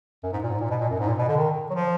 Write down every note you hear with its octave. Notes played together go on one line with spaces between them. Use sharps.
F#2
G#2
A#2
G#2
A#2
B2
A#2
F#2
G#2
A#2
B2
D3
D#3
F#3
F3